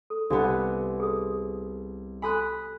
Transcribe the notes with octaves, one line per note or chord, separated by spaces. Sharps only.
A4
C2 B3 D4 F#4 A4
G#4 A4 D#6
F#4 A4 G#5 B5 D#6 F#6